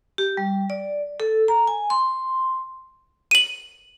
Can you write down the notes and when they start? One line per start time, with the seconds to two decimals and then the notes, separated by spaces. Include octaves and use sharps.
0.18 G4
0.37 G3
0.70 D5
1.20 A4
1.48 A#5
1.67 G#5
1.90 C6
3.31 D#7 F#7